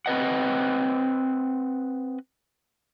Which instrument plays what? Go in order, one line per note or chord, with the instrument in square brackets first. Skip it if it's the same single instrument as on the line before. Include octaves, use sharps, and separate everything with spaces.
[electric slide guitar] C4 B4 D#5 F#5